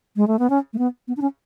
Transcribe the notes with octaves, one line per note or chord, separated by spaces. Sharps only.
G#3
A3
B3
C#4
A3
B3
B3
D4
C#4